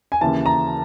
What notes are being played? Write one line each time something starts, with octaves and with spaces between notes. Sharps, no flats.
G#5
D#2 C#3 E3 A5
A#5